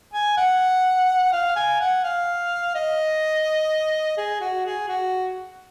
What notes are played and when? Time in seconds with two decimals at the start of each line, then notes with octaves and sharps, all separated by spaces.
0.14 G#5
0.37 F#5
1.33 F5
1.56 G#5
1.81 F#5
2.04 F5
2.75 D#5
4.17 G#4
4.41 F#4
4.66 G#4
4.89 F#4